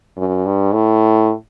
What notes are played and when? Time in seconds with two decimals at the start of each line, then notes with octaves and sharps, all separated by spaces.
0.17 F#2
0.46 G2
0.73 A2